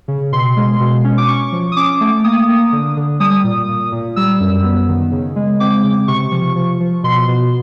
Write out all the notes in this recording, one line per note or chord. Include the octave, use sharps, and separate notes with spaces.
C#3
B2 C6
G#3
B2
C#4
D6
C#4 C#6
F3
D#6
C#4 D6
A3
A#3 D#6
A#3
D3
D3
G3 D#6
A#2
A#2
A#2
G3 E6
F#2
B3
D#3
C#3
G#3
C4 D6
C#3
C3 C#6
F3
F3
F3
B2 C6
B2